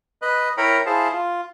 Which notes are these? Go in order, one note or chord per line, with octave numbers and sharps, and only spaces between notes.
B4 D#5 F#6
E4 A#4 C#5 G5 A#5 B5
E4 G#4 C5 F5 A5
F4